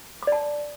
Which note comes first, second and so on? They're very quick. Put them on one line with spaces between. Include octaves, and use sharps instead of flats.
D6 D5 A5